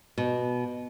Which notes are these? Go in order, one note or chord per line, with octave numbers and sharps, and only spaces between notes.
B2